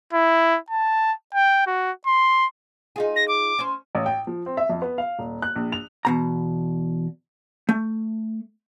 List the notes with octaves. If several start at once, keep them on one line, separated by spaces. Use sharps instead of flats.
E4
A5
G5
F#4
C6
D#4 F4 G#4
A#6
D6
C#4 C5
A1
G5
F3
C4
E5
F2
B3
F5
D#1
F#6
A#1
F7
E2 B2 A#5
A3